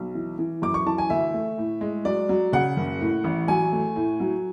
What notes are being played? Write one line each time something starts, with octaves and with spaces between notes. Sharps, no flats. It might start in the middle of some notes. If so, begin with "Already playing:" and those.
Already playing: B1
E3
E3
F#2 D6
C#6
E3 A5
G#5
D2 E5
A3
A2
G#3
F#3 D5
F#3
C#3 F#5
F#1
A2
A1
F#3 G#5
A3
A2
F#3